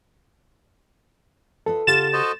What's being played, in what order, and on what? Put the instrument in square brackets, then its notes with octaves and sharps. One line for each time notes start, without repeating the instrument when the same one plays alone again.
[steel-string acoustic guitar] F4 B4 D#5 [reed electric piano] A4
[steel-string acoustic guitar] C#3 G4 F#5 [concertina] F4 [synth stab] A6 E7
[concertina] F#4 C5 D#5